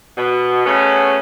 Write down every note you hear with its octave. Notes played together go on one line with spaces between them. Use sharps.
B2
C#3 A3 B3 C#4